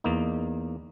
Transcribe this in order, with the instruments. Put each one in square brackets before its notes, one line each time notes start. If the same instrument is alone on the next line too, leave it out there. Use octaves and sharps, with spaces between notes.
[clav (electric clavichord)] E2 A#3 D#4